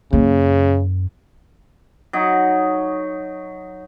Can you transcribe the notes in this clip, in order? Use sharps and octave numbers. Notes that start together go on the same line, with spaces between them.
F#2 C#3 A#3
F#3 D#4